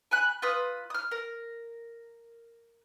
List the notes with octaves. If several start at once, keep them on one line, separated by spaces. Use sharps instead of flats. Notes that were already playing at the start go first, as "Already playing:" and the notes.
G#5 B5 F#6
F4 B4 D#6
D#6 F6
A#4